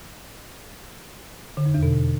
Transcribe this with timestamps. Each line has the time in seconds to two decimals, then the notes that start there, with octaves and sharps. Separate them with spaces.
1.57 D3
1.66 F2
1.74 E2
1.83 B2